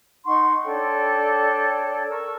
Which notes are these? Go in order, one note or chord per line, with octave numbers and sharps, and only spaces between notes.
D#4 F#5 C6 C#6
D4 A4 C#5 G5
A#4 C#6 E6